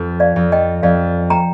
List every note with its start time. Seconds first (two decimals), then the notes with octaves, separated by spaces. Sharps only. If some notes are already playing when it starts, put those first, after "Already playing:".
Already playing: F2
0.20 D5 F5
0.36 F2
0.52 D#5 G5
0.83 F2 D5 F5
1.30 G5 A#5